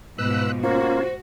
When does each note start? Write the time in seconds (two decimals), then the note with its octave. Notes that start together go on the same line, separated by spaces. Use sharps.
0.18 G#2 B2 F3 B4 E6 F#6
0.63 A#3 C#4 F4 F#4 C5